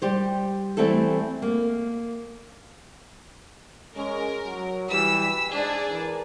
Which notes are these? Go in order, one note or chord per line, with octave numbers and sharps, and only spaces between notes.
G3 G4 C5
E3 G3 A3 C4 E4 A4
A#3
G#3 C#4 A#4
F#3
E3 G3 E6 B6
G#2 D4 G#4 D5
E3 A#4